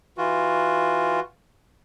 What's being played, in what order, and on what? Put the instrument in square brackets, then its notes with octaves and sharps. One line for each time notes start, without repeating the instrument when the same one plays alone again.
[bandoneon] E3 F4 F#4